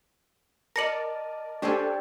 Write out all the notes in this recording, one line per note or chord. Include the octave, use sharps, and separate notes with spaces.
A#4 D5 D#5 A5 A#6 C#7 F#7
C#4 D4 G4 A4 C5 D5